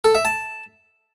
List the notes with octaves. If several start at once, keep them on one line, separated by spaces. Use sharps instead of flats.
A4
E5
A5